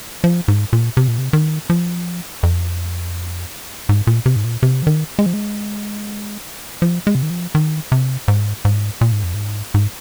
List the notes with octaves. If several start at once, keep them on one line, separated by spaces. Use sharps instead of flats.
F3
G#2
A#2
C3
A#2
C3
D#3
F3
F2
G#2
A#2
C3
G#2
A#2
C3
F3
D#3
G#3
F3
G#3
F3
G#3
C3
D#3
F3
D#3
C3
G#2
G#2
A#2
G#2
F2
G#2
G#2